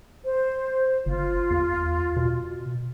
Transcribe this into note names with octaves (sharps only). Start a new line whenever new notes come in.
C5
G1 F4
E2
B2